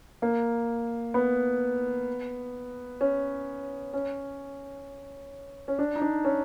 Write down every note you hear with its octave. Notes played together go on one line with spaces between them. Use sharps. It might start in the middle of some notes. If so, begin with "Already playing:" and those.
A#3
B3
C#4
C#4
C#4
D4
D#4
D4
C#4